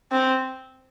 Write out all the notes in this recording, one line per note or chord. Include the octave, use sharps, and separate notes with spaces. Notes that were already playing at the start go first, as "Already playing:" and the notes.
C4